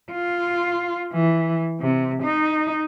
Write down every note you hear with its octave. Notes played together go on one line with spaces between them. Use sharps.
F4
E3
C3
D#4